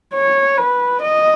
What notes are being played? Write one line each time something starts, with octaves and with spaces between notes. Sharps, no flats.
C#5
B4
D#5